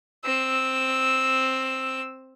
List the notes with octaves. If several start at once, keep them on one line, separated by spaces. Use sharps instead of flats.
C4 E6